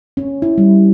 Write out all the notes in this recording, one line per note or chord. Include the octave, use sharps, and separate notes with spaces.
C#4
E4
G3